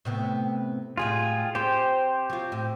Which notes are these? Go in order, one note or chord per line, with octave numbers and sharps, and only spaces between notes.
A2 C3 B3
A2 G3 G#3 F4 G#4
C4 G4 C5
F#3 F4
A2